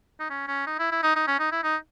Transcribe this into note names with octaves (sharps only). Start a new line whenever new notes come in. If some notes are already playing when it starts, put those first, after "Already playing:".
D#4
C#4
C#4
D#4
E4
E4
D#4
D#4
C#4
D#4
E4
D#4